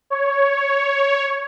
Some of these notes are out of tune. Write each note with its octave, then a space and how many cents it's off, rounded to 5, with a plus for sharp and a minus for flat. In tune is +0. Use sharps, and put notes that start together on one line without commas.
C#5 +5